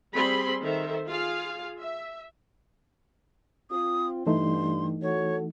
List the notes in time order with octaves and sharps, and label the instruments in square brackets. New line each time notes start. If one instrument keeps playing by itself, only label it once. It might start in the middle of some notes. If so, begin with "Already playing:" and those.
[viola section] G3 C4 G#4 B5 C6
D#3 A4 C5 E5
F4 G#4 F5
E5
[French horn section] C4 F4 [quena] D#6
[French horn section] G2 [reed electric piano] E3 A3 D#4 [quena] C6
[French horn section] F#4 A4 [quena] C#5